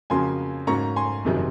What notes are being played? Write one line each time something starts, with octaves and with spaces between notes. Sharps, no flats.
F2 C#3 F#3 A#3 C#4 G#5 C6
G#2 F#3 A#3 C#4 A#5 C#6
G#5 C6
F#1 F2 C3 D#3 F#3